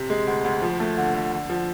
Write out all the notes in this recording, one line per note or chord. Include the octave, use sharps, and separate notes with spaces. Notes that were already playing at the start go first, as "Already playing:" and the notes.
Already playing: C3
G#3
D2
D2
F3
A3
D3
D3
D3
F3